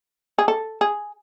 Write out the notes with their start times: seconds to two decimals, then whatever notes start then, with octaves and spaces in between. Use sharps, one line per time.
0.38 G#4
0.48 A4
0.81 G#4